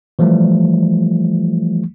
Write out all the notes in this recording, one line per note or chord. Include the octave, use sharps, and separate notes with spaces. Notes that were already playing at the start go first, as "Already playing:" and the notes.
E3 F3 G3 A3